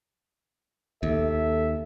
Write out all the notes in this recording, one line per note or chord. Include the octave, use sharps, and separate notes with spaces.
D#2 A4 E5